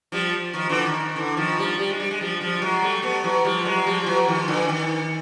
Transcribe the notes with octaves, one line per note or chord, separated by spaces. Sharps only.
F3 G3
D#3 F3
D3 E3
D#3
D#3
D3 E3
D#3 F3
F3 G3
G3
G#3
G3
G#3
F3 G3
F3 G3
G3
F#3 G#3
G3 A3
A3 B3
E3 F#3
F3 G3
F#3 G#3
F3 G3
G3
E3 F#3
D#3 F3
D3 E3
D#3